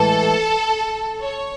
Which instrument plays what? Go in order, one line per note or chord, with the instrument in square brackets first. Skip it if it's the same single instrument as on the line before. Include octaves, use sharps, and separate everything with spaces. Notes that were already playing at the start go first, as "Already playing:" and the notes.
Already playing: [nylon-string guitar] A2 E3 G#3 [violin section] A4
[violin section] C#5